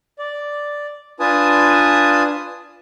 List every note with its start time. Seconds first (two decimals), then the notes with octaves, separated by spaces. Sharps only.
0.19 D5
1.20 D4 F4 B4 G#5 A5 D#6